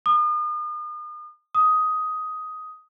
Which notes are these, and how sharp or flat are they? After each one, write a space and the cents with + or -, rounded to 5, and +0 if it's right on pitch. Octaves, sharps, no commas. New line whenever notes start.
D#6 -40
D#6 +10